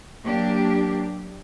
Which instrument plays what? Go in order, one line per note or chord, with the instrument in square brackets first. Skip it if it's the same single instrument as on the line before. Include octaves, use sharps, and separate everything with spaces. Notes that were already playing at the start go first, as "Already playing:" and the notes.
[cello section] F#3 A#3 D4 G4